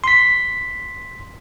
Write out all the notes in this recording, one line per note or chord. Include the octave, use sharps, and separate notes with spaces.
C6 B6